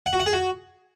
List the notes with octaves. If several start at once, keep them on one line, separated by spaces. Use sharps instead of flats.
F#5
F#4
F#5
G#4
F#4